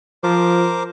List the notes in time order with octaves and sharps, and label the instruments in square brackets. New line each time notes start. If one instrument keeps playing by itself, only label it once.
[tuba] F3 [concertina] A#4 C5 D6